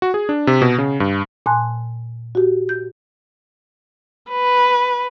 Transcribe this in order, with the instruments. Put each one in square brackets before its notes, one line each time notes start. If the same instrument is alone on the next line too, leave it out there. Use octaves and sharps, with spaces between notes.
[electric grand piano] F#4
G#4
D4
C3
B2
C#3
G2
[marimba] A#2 G#5 A5 C6 F#6
F#4 G4
G6
[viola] B4